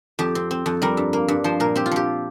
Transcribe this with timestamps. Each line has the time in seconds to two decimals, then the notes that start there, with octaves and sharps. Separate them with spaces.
0.19 F2 G4
0.35 C4
0.51 C4
0.66 F2
0.82 G3 A#4
0.97 G2
1.13 A#3
1.28 G2
1.44 F3 C5
1.60 A#2 A#4
1.75 C4 G4
1.86 F4
1.91 F3 G4